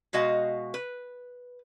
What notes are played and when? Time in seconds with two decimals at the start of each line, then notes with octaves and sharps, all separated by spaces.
0.13 B2 G#3 F#4 D#5 F5
0.74 B4